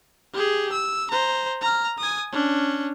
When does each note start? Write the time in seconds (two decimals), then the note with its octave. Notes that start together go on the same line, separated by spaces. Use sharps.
0.34 G4 G#4
0.72 E6
1.11 C5 A#5
1.61 A#5 F6
1.98 G#5 D#6
2.32 C#4 D4